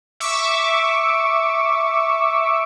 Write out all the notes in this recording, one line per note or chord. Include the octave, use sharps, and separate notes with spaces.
E5 C#6 D6 E6